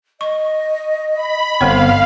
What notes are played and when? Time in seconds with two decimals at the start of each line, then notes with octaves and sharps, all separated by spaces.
0.21 D#5 C#6
1.15 B5
1.61 G1 D3 B3 C4 C#5 F5